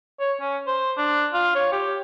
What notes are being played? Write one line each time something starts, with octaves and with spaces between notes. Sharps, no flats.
C#5
C#4
C5
D4
F4
C#5
G4